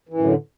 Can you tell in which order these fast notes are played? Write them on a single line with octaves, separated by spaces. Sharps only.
E3 F#2 A2 D3